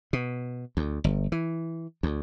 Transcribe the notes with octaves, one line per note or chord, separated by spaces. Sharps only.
B2
D2
G1
E3
D2